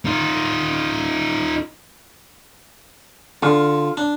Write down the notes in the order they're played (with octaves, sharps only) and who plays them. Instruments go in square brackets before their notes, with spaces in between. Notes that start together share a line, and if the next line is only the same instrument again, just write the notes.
[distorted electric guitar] D#4 F4
[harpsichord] D3 [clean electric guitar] F4
[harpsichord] D4